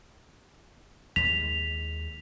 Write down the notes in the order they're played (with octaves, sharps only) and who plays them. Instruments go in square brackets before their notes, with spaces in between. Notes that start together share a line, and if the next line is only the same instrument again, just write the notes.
[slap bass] D#2 G#3 [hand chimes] B6 [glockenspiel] F7